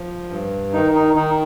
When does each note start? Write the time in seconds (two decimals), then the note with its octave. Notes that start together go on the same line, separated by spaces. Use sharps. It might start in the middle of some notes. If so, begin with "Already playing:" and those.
Already playing: F3
0.30 G2
0.73 D#3 D#4
0.95 D#4
1.16 D#3 D#4